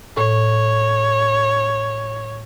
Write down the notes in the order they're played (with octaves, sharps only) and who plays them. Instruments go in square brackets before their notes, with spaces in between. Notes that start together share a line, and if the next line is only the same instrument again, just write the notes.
[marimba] A2 [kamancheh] C#5